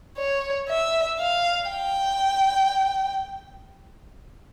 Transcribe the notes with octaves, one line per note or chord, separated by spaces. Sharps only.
C#5
E5
F5
G5